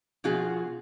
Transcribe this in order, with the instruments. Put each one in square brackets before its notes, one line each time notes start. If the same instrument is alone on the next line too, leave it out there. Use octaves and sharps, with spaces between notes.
[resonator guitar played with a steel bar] B2 F3 F4 F#4 G#4